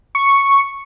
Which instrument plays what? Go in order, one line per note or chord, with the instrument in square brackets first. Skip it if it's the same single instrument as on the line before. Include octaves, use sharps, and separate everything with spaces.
[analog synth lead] C#6